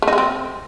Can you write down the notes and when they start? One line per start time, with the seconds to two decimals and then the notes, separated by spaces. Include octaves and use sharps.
0.02 A3
0.08 D#4
0.13 G#3
0.18 C4